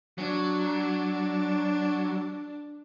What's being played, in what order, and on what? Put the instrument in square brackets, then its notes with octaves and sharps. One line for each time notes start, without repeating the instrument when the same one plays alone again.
[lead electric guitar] F#3 [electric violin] D4